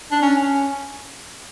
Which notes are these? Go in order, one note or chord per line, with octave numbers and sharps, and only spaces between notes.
D4
C#4
C#4